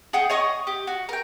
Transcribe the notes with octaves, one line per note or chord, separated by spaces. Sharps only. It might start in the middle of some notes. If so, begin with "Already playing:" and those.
G#4 F#5 G5
C#5 D#5 C#6 D#6
G4
F#4
A#4 G5